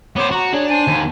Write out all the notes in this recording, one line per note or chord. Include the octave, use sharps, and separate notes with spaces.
B3 C5 C#5 F#5 D6
F#4 A#5
D4 G#4 C#5
C5 G#5 A5
D#2